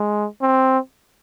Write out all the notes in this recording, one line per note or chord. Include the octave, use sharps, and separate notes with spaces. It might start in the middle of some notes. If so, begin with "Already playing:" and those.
Already playing: G#3
C4